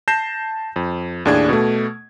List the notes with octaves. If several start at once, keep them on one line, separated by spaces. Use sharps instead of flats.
A5 G6 A#6 C7 E7
F2
D#2 A2 D4 G#4 G#6
B2 A3